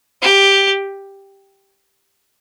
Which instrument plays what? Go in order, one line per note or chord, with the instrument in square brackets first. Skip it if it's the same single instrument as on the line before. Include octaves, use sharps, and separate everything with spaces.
[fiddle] G4